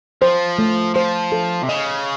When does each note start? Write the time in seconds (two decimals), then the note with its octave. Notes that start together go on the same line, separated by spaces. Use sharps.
0.22 F3 C5
0.59 A3
0.95 F3 C5
1.32 A4
1.63 C3
1.69 C#3 D#5